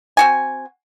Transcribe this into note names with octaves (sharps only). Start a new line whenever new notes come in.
C4 F#4 G#5